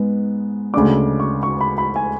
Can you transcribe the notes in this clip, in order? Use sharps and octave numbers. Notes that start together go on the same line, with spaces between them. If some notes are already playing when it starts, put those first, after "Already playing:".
Already playing: G#2 G#3 B3
D2 C#3 G#3 D4 D6
C#6
C#6
B5
B5
G#5